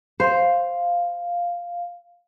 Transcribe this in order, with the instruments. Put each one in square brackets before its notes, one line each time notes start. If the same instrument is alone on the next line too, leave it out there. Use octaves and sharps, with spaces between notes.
[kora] C5 [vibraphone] F5